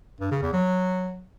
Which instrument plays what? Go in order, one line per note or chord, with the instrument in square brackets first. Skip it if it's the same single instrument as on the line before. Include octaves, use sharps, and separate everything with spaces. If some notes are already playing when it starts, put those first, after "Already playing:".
[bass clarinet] G2
C#3
E2
F#3